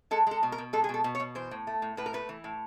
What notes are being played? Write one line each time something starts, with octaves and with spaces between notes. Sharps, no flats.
G#3 A4
G#3 A4
B2
A#4
B2
G#3 A4
G#4
B2 A4
B2
C#5
B2
E3 C5
A2
A3
A2
A2 B4
A#4
A3 B4
E3
A2